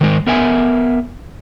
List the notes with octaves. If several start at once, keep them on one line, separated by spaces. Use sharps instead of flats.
D#3 G#3 A#4
B3 A#4 E5 G#5